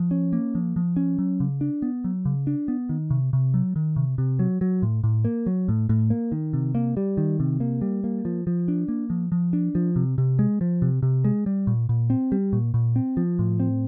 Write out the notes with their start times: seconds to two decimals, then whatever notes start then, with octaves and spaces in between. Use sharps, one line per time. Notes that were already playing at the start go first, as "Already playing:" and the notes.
Already playing: F3
0.11 C#4
0.33 A#3
0.55 F3
0.76 F3
0.96 C#4
1.19 F#3
1.40 C#3
1.61 D4
1.82 B3
2.04 F#3
2.26 C#3
2.47 D4
2.68 B3
2.89 D#3
3.11 C3
3.33 C3
3.54 F#3
3.76 D#3
3.96 C3
4.18 C3
4.39 F#3
4.61 F#3
4.83 A2
5.04 A2
5.25 A#3
5.46 F#3
5.69 A2
5.89 A2
6.10 A#3
6.32 D#3
6.53 C3
6.75 A#3
6.97 G3
7.17 D#3
7.40 C3
7.60 A#3
7.81 G3
8.04 A#3
8.25 F3
8.47 F3
8.68 D4
8.88 A#3
9.10 F3
9.32 F3
9.53 D4
9.75 F3
9.96 C3
10.18 C3
10.39 G#3
10.61 F3
10.82 C3
11.03 C3
11.24 G#3
11.46 G3
11.67 A#2
11.89 A#2
12.10 C4
12.32 G3
12.53 A#2
12.74 A#2
12.96 C4
13.17 F3
13.39 A2
13.60 C4